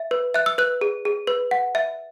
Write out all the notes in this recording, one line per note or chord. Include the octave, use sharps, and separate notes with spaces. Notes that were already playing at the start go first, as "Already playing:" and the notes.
Already playing: E5
B4
E5 F#6
E6
B4 F#6
G#4
G#4
B4
F#5
E5